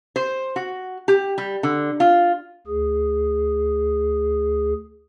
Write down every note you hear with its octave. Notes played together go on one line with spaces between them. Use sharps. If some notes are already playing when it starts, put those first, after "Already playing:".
C5
F#4
G4
G3
D3
F4
D2 G#4